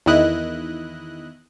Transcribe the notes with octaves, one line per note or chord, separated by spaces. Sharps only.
E2 D#3 E4 D#5 F#6